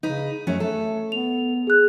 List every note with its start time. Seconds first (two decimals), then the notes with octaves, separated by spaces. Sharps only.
0.03 C#3 D#4 B4
0.47 F#2 F#3 A3 C#4
0.60 A3 A4
1.12 B3 F7
1.67 G#4 F#6